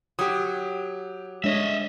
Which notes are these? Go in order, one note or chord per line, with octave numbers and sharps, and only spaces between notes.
F#3 G4 D#6
G#3 D4 C#5 D#5 E5